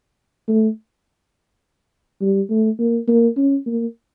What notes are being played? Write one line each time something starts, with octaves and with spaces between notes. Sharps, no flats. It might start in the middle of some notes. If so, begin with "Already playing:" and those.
A3
G3
A3
A#3
A#3
C#4
A#3